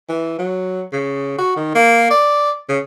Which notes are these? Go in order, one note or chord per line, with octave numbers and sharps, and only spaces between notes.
E3
F#3
C#3
F#4
D#3
A#3
D5
C#3